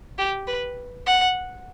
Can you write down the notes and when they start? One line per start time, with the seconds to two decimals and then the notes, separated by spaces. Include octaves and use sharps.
0.18 G4
0.47 B4
1.06 F#5